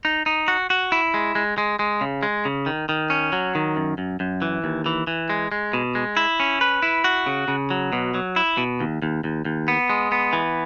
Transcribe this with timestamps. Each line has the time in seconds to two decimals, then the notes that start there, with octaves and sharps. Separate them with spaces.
0.05 D#4
0.26 D#4
0.48 F#4
0.70 F#4
0.92 E4
1.14 G#3
1.35 G#3
1.58 G#3
1.79 G#3
2.01 C#3
2.23 G#3
2.45 C#3
2.66 D#3
2.89 D#3
3.10 C#4
3.33 F#3
3.55 D#3
3.76 F#2
3.98 F#2
4.20 F#2
4.42 E3
4.64 D#2
4.86 E3
5.07 E3
5.30 G#3
5.52 G#3
5.73 B2
5.95 G#3
6.17 E4
6.40 C#4
6.61 B4
6.83 E4
7.04 F#4
7.26 C#3
7.48 C#3
7.71 F#3
7.93 B2
8.14 F#3
8.36 E4
8.57 B2
8.80 D#2
9.02 D#2
9.24 D#2
9.45 D#2
9.68 B3
9.90 G#3
10.12 B3
10.33 E3